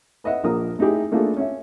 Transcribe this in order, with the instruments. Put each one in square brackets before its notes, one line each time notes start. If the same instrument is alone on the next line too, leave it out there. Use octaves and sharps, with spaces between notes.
[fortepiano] B4 D#5 E5 F#5
A#1 F3 A#3 A#4 D#6
A3 D#4 E4 G4 G#4
A3 A#3 D4 F4 G#4 A4
C#4 E5